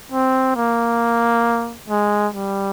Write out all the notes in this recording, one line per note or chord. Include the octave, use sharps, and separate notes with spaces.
C4
A#3
G#3
G3